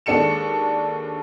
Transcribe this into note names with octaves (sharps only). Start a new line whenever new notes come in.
D#2 G#3 D4 A4 C#7 E7